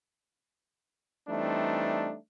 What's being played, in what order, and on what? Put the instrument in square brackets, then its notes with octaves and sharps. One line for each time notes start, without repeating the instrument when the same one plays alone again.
[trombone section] E3 G3 A3 C4 D4 D#4